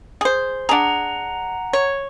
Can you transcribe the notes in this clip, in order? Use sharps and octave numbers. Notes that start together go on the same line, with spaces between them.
G#4 C5
D4 G#4 F#5 A#5
C#5